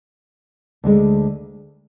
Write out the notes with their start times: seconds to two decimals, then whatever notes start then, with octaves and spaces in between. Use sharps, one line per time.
0.84 D2 D3 G#3